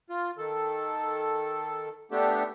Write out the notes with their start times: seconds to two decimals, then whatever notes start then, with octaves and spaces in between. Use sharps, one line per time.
0.10 F4
0.38 D#3 A4
2.11 A3 B3 D4 G4 A4